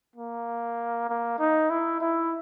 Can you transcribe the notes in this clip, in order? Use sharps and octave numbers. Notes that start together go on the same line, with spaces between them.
A#3
A#3
D#4
E4
E4